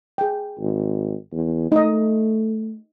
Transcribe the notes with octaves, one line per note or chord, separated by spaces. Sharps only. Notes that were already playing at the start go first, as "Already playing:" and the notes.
G#4 G5
G#1
E2
A3 D#4 D#5